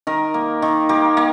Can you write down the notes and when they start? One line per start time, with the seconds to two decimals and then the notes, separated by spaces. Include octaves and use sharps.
0.07 D#3 A#4
0.34 A#3
0.62 D#3
0.89 A#3 G4
1.17 A#3